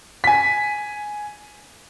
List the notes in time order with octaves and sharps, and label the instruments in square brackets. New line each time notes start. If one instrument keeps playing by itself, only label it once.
[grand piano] G#5 B6